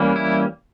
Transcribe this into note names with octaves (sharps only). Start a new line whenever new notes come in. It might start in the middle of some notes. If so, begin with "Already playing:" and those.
Already playing: E3 G3 A#3 C#4
E4